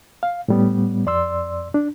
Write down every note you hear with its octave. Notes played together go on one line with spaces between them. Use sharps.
F5
A2 G3 B3
F2 D5 C6 E6
D4